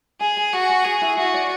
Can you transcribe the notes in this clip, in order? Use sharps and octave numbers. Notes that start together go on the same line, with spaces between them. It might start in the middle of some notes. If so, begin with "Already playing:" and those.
G#4 G#5
G#5
F#4 G#5
G#5
G#4 G#5
E4
E4 F#4
D5